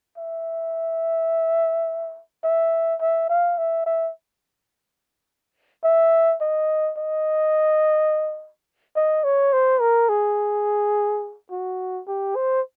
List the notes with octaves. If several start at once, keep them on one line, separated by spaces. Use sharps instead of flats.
E5
E5
E5
F5
E5
E5
E5
D#5
D#5
D#5
C#5
C5
A#4
G#4
F#4
G4
C5